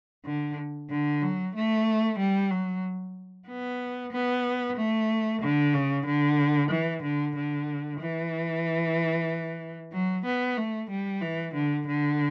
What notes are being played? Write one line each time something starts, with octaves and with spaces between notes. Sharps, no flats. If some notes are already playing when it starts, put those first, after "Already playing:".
D3
D3
F#3
A3
G3
F#3
B3
B3
A3
D3
C#3
D3
E3
D3
D3
E3
F#3
B3
A3
G3
E3
D3
D3